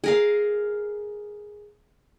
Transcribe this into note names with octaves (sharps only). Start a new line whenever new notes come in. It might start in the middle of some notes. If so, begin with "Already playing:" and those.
G#4 A#4 F5